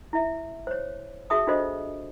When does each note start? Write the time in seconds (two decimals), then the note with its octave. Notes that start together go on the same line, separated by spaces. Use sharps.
0.13 E4 E5
0.67 C5 C#5
1.30 F#4 G#4 E5 A5 D#6
1.47 D4 F4 F#4 A4 C5 D#5